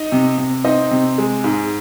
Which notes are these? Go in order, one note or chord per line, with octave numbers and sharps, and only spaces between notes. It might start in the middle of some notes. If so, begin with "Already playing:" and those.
Already playing: D#4 D#5
C3
C3
C4 D#4 D#5
C3
G#3
G#2